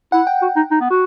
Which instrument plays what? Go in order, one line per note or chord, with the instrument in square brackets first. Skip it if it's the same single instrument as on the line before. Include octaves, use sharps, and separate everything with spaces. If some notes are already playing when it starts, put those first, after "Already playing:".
[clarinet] E4 [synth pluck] F#5
[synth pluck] G5
[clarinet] F#4
D#4
D#4
B3
F#4